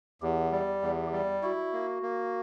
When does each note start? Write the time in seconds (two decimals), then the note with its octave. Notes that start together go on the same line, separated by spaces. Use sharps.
0.22 E2 G4
0.52 G3
0.82 E2
1.13 G3
1.43 E4 F#4
1.73 A#3
2.03 A#3